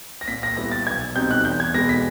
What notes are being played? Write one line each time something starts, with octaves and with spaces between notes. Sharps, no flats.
A#6
A#2 B6
A#6
G3 B3 E4 A#6
A6
B1 G#6
B2 G3 C4 D#4 G6
F#6
E2 G6
G#6
B2 G#3 B3 A#6
B6